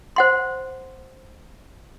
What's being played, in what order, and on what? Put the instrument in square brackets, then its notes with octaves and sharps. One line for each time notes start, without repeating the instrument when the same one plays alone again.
[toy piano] C5 F#5 C6